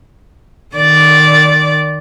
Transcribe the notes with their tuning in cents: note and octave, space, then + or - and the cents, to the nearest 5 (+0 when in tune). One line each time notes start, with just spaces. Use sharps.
D#3 -15 D5 -10